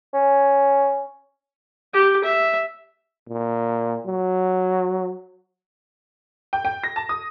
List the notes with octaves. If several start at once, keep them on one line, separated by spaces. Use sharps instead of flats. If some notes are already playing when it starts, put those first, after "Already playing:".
C#4
G4
E5
A#2
F#3
G5
G5
A#6
A5
D#6